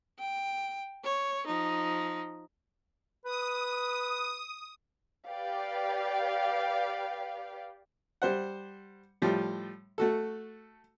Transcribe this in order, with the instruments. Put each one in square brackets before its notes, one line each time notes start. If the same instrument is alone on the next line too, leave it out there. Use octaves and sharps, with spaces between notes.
[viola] G5
C#5
F3 D#4
[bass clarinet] B4 [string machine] D#6
[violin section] G4 B4 D5 F5 G5
[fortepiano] G3 C5 F#5
A2 F3 G3
A3 F#4 A4